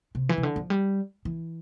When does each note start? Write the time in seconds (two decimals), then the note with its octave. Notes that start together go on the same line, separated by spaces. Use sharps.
0.15 C3
0.29 E3
0.38 C3
0.43 D3
0.56 F3
0.70 G3
1.25 E3